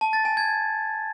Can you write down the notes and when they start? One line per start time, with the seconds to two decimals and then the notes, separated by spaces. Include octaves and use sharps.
0.01 A5
0.13 A6
0.25 G#5
0.37 G#6